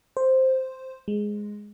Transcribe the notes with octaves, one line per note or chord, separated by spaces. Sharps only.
C5
G#3